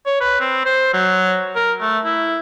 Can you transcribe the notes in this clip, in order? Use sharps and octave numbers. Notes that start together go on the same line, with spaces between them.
C#5
B4
C4
C5
F#3
A#4
A3
E4